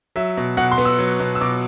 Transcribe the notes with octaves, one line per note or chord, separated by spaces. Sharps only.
F#3 E5
B2
B2 F#5
C6
B3
E6
F#3
B2
E6
B2 D6